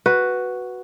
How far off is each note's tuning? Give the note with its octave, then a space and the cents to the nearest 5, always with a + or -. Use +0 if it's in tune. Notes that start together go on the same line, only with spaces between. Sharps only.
F#4 +0 B4 +0